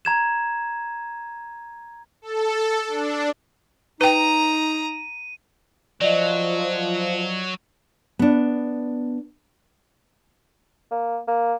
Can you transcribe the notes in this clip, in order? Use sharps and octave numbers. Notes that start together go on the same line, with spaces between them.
A#5 G#6 E7
A4
D4
D#4 B4 G5 A#5 D#7
F3 F#3 D5 D#5
B3 D4
A#3
A#3